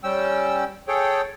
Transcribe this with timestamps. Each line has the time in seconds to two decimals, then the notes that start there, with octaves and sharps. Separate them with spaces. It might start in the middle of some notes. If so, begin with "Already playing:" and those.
0.04 G3 C#4 G5 E6
0.88 G#4 A4 C#5 G5